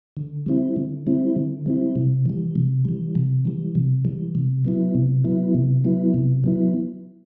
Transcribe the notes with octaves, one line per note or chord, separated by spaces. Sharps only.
D3
G3 C4 E4
D3
G3 C4 E4
D3
G3 C4 E4
C3
E3 G3
C3
E3 G3
C3
E3 G3
C3
E3 G3
C3
F#3 B3 E4
C3
F#3 B3 E4
C3
F#3 B3 E4
C3
F#3 B3 E4